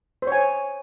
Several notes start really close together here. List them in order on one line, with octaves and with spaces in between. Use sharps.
C5 C#5 G#5